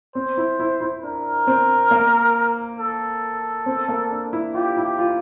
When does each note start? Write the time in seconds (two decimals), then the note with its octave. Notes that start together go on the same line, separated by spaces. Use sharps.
0.15 C4 C5
0.37 E4
0.60 E4
0.80 E4
1.03 D4 A#4
1.47 C4
1.91 A#3
2.79 A4
3.66 C4
3.88 A#3
4.11 D4
4.33 E4
4.54 F4 G4
4.77 E4
4.84 G4
4.99 F4